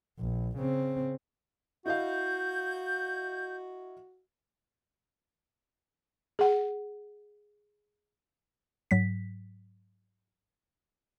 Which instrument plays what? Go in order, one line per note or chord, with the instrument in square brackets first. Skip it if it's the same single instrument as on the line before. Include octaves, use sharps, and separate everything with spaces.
[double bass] A#1
C#3 C4
[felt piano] E4 D#5 F5 [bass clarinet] F#4 [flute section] G6
[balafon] G#4 F#5
[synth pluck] G#2 F#3 B6